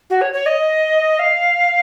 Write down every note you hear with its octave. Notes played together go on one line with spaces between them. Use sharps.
F#4
C#5
C#5
D#5
F5